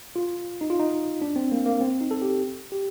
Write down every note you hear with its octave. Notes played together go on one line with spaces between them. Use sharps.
F4
D#4
F4
D#4
D4
C4
A#3
A#3
C4
D#4
A4
G4
G4